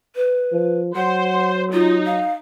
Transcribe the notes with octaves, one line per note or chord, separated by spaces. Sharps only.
B4
F3
F#3 C5 F#5
D#4 F4
F5